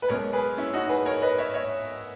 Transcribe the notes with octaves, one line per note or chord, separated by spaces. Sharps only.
B4
B1 B2 G#3 C#4 A#4 C#5
G#4 B4
C#4 E4
D#4 F#4
G#4 B4
A#4 C#5
B4 D#5
C#5 E5
C#5 E5